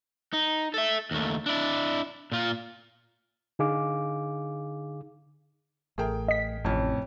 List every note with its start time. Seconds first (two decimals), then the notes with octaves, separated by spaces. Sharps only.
0.33 D#4
0.74 A4 E5
1.11 D#2 A3
1.46 D4 E4
2.32 A#2 F4
3.59 D3 D#4 G#4 F5 D6
5.98 A1 A3 G#4 A#4 G5
6.28 D#5 B6
6.65 A1 F2 A2 C3 C#4